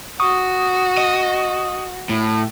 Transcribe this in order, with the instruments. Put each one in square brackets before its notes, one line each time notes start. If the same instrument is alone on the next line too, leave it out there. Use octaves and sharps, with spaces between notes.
[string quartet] F#4 [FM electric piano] C#6 D#6
[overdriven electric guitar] D#5
A2